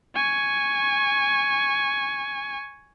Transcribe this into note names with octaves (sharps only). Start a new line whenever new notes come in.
G#5 C#6